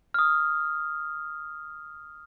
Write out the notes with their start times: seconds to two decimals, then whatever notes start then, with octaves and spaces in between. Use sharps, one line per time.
0.14 D#6 F6